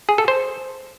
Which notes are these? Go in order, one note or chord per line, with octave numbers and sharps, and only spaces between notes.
G#4
A4
C5